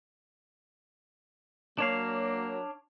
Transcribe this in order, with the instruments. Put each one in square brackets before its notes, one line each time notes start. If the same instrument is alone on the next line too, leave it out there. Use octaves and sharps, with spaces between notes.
[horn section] F#3 A#4 [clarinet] A#3 [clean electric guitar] D4 C#5 F5